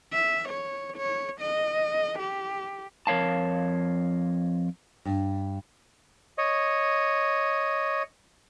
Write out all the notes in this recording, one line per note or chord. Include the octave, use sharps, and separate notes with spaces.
E5
C#5
C#5
D#5
G4
F2 A#4 C#5 F5 A5
G2
C#5 D#5